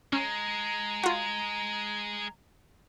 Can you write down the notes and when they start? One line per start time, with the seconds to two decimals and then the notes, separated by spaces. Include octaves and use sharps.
0.13 G#3 C#4 A#5
1.03 F4 F#4